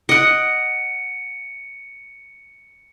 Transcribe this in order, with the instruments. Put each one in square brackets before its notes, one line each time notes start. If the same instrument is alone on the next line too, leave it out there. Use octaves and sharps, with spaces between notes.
[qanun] D#5 F#5 [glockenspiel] C#7 D7